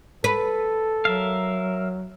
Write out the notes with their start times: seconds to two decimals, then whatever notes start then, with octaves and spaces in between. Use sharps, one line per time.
0.24 A4 B4
1.05 F#3 A#4 E5 F5